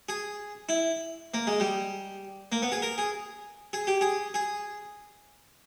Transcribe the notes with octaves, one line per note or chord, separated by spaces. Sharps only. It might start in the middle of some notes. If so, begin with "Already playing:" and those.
G#4
E4
A#3
G#3
G3
A#3
B3
G#4
A#4
G#4
G#4
G4
G#4
G#4